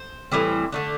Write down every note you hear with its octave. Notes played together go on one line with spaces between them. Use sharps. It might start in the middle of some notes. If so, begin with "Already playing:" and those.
Already playing: C5
A2 E3 G3 C4
D3 A3 D4